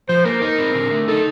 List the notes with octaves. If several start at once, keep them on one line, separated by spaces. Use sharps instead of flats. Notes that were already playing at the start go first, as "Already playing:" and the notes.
F3 C5
A#3 A#4
D#4 A#4
C4
D3
A3
D#4 A4